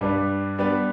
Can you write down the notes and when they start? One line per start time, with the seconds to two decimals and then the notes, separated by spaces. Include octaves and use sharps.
0.01 G2 G3 D4 B4 D5
0.58 G3 B3 D4 B4 D5